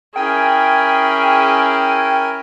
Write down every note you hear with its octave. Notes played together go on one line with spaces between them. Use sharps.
C#4 E4 G#4 A#4 G5 G#5